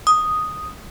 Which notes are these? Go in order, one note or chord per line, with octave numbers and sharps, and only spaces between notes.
D#6